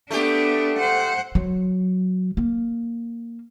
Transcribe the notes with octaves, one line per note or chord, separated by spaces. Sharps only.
A3 B3 D4 G4
C5 F#5
F#3
A#3